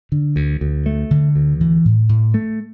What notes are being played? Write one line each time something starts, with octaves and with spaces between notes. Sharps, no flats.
D3
D2
D2
A3
D3
D2
E3
A2
A2
A3